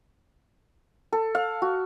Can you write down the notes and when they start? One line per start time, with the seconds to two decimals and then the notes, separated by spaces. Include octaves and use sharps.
1.12 A4
1.35 F5
1.62 F#4